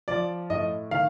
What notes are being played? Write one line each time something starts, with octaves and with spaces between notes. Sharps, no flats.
F3 D5
A2 D#5
D#3 F5